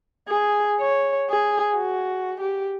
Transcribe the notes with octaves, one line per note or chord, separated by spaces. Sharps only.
G#4
C#5
G#4
F#4
G4